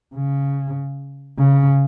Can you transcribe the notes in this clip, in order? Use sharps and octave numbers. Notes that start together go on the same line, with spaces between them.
C#3
C#3